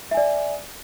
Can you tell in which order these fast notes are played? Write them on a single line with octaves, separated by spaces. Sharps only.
E5 G#5 D5